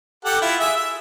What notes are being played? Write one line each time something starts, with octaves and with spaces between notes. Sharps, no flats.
G4 A4 F#5
E4 F4
G#4 E5
E5